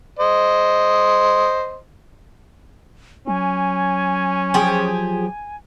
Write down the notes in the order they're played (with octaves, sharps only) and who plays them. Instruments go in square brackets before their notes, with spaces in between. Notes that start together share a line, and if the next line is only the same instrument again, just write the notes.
[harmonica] C5 D#5
[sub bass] F#3 [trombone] C#4 [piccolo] G#5
[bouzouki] F3 G4 G#4